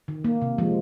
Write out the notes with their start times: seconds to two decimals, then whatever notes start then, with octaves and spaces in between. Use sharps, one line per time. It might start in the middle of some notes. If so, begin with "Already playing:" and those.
0.08 D#3
0.24 A#3
0.42 C3
0.58 F3 G#3